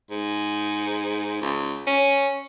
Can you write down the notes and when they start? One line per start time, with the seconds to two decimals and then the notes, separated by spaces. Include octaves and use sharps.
0.11 G#2
1.41 C#2
1.87 C#4